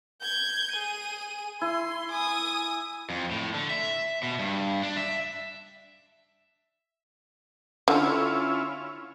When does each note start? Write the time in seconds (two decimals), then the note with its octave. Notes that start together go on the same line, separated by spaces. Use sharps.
0.21 G6 G#6
0.72 G#4 D#7
1.61 E4 C6
2.10 G#5 D#6
3.10 F2
3.31 A2
3.54 D3
3.70 E5
4.23 B2
4.39 G2
4.83 D4
4.96 E5
7.88 D3 C#4 E4 F4